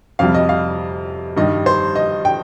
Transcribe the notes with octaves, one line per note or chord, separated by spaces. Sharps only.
F2 C3 G3 F5
D#5
F5
G2 D#3 G3 D#5
C5
D#5
G5